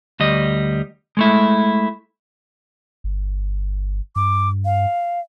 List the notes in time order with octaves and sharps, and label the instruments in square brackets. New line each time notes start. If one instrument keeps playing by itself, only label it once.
[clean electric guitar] D2 G3 D#5
G#3 A3 E4
[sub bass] G1
[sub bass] G2 [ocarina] D6
[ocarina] F5